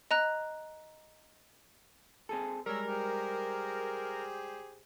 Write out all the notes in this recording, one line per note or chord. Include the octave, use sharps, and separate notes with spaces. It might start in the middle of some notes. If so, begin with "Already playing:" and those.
D#5 A#5 F#6
C4 G#4 A4
G3 G#3 A#4 C#5 E6
G4 G#4 C5